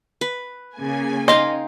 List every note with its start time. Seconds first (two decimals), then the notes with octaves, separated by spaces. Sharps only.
0.21 B4
0.76 C#3 A#3 G#5
1.28 D#4 D#5 F5 G5 C6